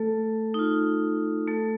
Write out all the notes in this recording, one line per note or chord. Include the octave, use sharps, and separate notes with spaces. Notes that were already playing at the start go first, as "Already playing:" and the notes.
Already playing: A3 A4
D#4
F4
A3 A4